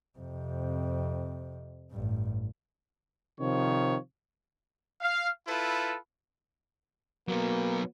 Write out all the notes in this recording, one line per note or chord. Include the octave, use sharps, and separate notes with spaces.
F2 C3
A1 G2
C3 D#3 F3 C#5
F5
E4 F4 A4 B4
F#3 A#3 B3